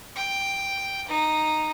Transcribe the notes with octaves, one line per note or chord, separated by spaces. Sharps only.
G5
D#4